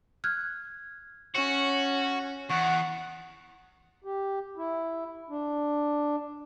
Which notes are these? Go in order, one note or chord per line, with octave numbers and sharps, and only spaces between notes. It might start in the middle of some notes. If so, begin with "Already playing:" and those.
F6 F#6 G#6
C#4 F#4
E2 F#5 C#6 F#6
G4
E4
D4